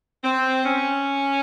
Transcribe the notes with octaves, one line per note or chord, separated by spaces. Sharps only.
C4
C#4